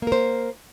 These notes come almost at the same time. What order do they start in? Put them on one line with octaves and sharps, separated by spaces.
A#3 A#4 C5